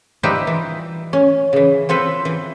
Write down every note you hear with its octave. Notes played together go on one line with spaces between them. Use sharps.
F3 G3 D#4 G4 B4 E5
E3
C#4
C#3 E3
F3 C4 A4 B4
E3